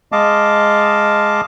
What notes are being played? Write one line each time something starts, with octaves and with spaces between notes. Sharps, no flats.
G#3 D#5 F5 A5 D6